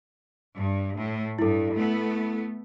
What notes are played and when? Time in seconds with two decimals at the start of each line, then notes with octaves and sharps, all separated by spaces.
0.56 G2
0.97 A2
1.39 G2 E4 A4
1.75 A3 B3